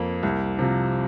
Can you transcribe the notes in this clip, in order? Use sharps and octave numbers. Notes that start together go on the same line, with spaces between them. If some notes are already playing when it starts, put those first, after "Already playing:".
Already playing: F2 A#3
C2
C3 F3